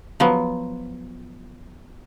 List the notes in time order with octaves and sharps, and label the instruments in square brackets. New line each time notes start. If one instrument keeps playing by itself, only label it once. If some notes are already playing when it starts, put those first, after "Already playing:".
[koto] F3 F#3 B3